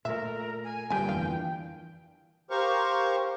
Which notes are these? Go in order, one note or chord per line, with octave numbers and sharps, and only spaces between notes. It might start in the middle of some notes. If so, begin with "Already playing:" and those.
A#2 A3 A#4 E5
G#5
G1 G2 A#2 A#3 G4 G5 G#5
F2 E3 F5
G4 A#4 C5 F5 C#6